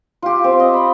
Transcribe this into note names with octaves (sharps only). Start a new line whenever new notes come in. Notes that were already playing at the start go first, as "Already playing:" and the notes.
F4 G4
C4
D#5
B5